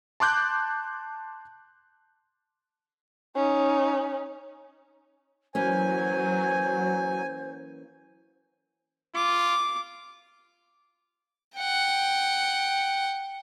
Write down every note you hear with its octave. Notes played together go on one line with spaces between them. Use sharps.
A5 C6 D6 F#6 G6
C#4 D#4
E3 F#3 A#3 C#4 C5 G#5
F4 D6
F#5 G5